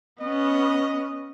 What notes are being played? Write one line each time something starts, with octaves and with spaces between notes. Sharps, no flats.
B3 C#4 D#5